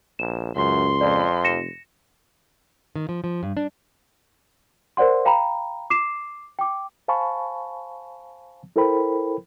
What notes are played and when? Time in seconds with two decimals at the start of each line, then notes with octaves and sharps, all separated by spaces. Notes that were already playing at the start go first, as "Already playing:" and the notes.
0.19 A#1 E7
0.56 C#2 F#2 C6
1.01 F2 D5
1.44 F1 A#6 C#7 E7
2.96 D#3
3.09 F3
3.24 F3
3.43 G2
3.57 D4
4.97 A#4 C5 D5 F#5 C6
5.25 F5 G5 A#5 B5
5.90 D6 C7 E7
6.59 G5 D6
7.08 C5 F5 G#5 A5 B5 C#6
8.76 E4 A4 A#4 C5 G5 B5